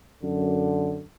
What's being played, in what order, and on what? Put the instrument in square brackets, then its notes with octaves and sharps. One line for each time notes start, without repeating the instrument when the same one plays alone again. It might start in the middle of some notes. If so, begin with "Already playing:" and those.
[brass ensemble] F#2 D3